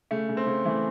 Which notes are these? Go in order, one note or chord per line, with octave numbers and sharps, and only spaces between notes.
C#3 A3
C#3
C4
C#3
E3 A3